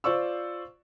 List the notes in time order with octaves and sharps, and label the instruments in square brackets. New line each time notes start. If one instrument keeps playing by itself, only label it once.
[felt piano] F4 C5 D5 C#6 E6